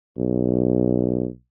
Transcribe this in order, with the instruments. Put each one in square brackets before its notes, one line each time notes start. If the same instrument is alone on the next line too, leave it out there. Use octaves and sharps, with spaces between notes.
[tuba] B1